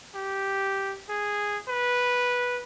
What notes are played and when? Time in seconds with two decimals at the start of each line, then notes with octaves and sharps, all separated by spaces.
0.15 G4
1.09 G#4
1.69 B4